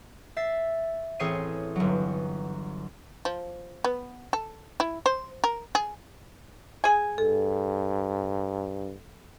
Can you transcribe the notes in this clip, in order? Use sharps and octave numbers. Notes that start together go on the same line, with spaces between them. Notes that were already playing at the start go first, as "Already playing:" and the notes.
E5 A6 C7
A1 C4 G#4 C#5 C7 D#7
G1 F#3
F3
B3
A4
E4
C5
A#4
G#4
G#4 G#5
G2 A4